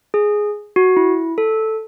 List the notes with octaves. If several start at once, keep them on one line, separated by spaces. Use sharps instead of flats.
G#4
F#4
E4
A4